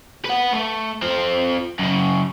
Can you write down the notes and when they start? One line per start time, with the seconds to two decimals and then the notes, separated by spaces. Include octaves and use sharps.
0.25 B4 F#5
0.53 A3
1.02 F3 C4
1.79 F#2 C#3